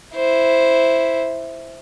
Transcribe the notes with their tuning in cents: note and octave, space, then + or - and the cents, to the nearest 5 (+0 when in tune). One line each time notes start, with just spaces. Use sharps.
E4 +0 C5 +0